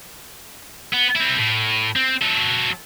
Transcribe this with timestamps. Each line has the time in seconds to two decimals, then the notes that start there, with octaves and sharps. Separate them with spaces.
0.93 B3
1.16 C4 E4
1.37 A2
1.96 C4
2.22 F#3 A4